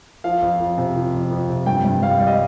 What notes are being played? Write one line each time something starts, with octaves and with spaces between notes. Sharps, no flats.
F3 F5
F2
F2
C3
F3
F2
F2
C3
G2 G5
G2
G3 F5
G3
D#5